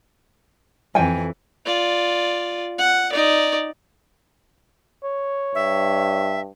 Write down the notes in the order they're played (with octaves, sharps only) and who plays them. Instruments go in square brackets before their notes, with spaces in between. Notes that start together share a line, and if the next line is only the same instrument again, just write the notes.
[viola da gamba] F2 E3 [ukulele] G5 G#5
[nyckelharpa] F4 D5
F#5
D#4 D5
[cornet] C#5
[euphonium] G2 [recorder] E5